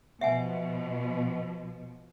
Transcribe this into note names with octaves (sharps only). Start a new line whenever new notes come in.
B2 F3 E5 F#5 G#5